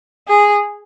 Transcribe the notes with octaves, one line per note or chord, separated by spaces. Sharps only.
G#4